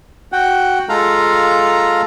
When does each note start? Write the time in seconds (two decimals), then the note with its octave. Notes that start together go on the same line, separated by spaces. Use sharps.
0.32 F#4 F#5 G5
0.89 G#3 F4 A4 F5 A#5